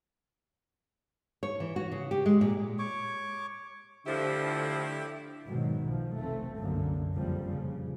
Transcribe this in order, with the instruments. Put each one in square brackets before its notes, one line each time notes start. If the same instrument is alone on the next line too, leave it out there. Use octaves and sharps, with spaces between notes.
[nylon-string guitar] C#5
E3
F#4
C#3
G4
G#3
A#2
[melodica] C#5 C#6 D6
[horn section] A2 F3 [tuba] D3 [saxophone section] E4 G4
[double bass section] G#2 B2 D#3 F#3
B1 F3
F1 A3 C4
C2 F#2 D3 A#3
A#1 F2 C#3 F3 G3
C#3